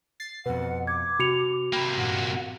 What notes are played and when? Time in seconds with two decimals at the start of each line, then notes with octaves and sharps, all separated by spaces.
0.20 A6 C7
0.46 F2 B2 B4 F#5
0.87 D6 G#6
1.19 C3 F#4 C#7 F7
1.73 C3 A#3 G5 B5
1.98 G2 A#2 F#5